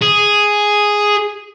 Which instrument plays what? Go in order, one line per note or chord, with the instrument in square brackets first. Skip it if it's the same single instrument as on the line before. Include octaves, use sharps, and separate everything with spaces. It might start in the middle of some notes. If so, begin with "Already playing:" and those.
[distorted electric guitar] G#4